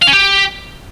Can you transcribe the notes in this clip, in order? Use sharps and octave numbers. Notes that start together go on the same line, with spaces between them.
F5
C#4
G4